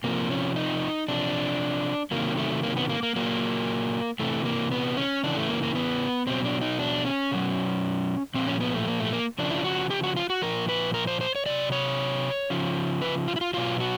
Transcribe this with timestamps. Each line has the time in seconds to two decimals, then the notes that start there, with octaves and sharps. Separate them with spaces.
0.04 C3 F3 A#3
0.30 C#4
0.56 D#4
1.08 C3 F3 D4
2.11 C3 D#3 F#3 A#3
2.37 A3
2.63 A#3
2.77 B3
2.89 A#3
3.03 A#3
3.16 A#2 F#3 A#3
4.20 C3 E3 A3
4.45 A#3
4.72 B3
4.97 C#4
5.23 C#3 E3 D4
5.37 A3
5.49 A#3
5.63 A#3
5.75 B3
6.27 B2 F#3 C4
6.45 D4
6.61 D#4
6.79 D4
7.05 C#4
7.31 B2 F#3
8.34 A#2 F3 C4
8.47 C#4
8.61 B3
8.74 A3
8.87 A#3
9.00 A3
9.13 A#3
9.39 C#3 F3 D4
9.51 E4
9.58 F4
9.64 F#4
9.90 G4
10.04 F#4
10.16 F4
10.30 F#4
10.42 A#2 F3 A#4
10.69 B4
10.94 A#4
11.07 C5
11.21 C5
11.36 C#5
11.46 C3 D#3 F#3 D5
11.72 C#5
12.50 C#3 F3
13.02 B4
13.28 F4
13.36 E4
13.41 F4
13.54 B2 F#3 F4
13.80 F#4